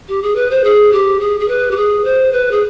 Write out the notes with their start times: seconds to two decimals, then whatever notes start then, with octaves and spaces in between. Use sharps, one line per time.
0.08 G4
0.22 G#4
0.35 B4
0.50 C5
0.63 G#4
0.92 G4
1.19 G#4
1.40 G#4
1.48 B4
1.71 G4
1.76 G#4
2.04 C5
2.32 B4
2.51 G#4